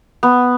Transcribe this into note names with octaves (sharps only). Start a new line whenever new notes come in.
B3